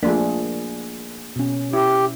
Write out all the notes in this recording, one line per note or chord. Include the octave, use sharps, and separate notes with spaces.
F3 A3 A#3 D4 G#4
B2 C#4
E4 G4